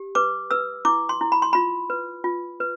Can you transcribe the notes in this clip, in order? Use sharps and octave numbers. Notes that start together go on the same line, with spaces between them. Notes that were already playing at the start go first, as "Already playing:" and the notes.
Already playing: G4
B4 D6
B4 E6
E4 D6
C6
E4
B5
C6
F4 B5
B4
F4
B4